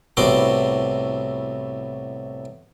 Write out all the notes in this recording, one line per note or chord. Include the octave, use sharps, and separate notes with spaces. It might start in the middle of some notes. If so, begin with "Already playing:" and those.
C2 A2 B3 F#4 C6 D6